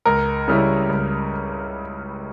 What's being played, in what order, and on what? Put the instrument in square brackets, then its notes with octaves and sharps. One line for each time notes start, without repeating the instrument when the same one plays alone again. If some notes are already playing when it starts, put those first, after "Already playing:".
[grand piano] C#2 A#4
C#3 G3 C#4 E4
C#2